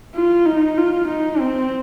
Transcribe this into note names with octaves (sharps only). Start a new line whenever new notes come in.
F4
D#4
F4
D#4
C4